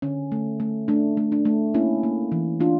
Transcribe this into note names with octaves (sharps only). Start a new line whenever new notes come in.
D3 C#4
A3
A3
A3 D4
A3
D4
A3
A#3 C#4 E4
A#3
E3
E3 D4 F4